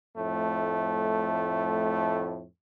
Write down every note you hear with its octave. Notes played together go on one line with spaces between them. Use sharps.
F2 A2 A3